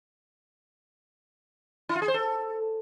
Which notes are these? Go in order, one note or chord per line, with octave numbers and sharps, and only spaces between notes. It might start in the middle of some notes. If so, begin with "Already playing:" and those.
E4
F4
G#4
C5
A4